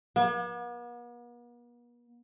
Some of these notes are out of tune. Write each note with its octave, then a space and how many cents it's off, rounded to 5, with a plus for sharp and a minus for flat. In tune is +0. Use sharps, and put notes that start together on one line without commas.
B3 -45